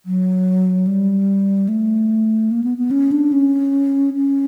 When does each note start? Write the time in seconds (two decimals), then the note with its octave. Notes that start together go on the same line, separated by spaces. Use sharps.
0.06 F#3
0.87 G3
1.68 A3
2.51 A#3
2.64 B3
2.78 B3
2.91 C#4
3.12 D4
3.32 C#4
4.14 C#4